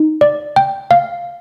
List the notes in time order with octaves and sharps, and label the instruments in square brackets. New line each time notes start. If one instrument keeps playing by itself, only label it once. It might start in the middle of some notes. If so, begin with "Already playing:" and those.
Already playing: [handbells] D#4
D5
G5
F5